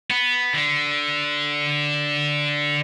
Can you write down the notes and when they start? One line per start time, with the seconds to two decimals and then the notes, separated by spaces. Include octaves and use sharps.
0.11 B3
0.53 D3